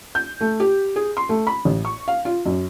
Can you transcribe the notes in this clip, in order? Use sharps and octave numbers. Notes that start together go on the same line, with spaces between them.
G6
A3
G4
G#4
C6
A3
B5
A1
C#6
F5
F4
F#2